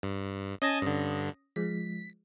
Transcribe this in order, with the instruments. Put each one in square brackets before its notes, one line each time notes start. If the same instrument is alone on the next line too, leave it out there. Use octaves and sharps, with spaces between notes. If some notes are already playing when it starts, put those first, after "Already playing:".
[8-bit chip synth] G2
[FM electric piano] C#4 D#6 A#6 [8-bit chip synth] D#5 G#5 A5
[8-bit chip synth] G2 D3
[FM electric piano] F3 G#3 [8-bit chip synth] B6